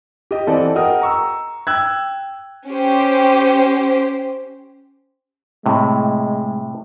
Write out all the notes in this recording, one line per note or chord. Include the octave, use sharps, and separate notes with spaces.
G4 D#5
E3 B3 C4 A4 D5 D#5
F#4 G#4 A#4 D#5 G5 D#6
A#5 C#6 E6
G5 E6 F#6 G#6
C#4 G4 C5
A2 C3 G#3